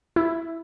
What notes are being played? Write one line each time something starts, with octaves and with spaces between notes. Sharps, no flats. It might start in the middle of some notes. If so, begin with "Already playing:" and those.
E4